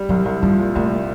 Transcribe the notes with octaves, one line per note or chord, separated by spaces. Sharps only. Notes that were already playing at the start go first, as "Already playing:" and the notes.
Already playing: G3
C2 F#3
C2
F3 G3
A#2
C2 A3